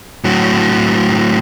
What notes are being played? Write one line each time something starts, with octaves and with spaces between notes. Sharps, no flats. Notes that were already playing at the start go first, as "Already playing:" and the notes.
A2 F#3